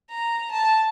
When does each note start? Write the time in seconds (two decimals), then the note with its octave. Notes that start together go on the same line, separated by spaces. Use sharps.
0.11 A#5
0.52 A5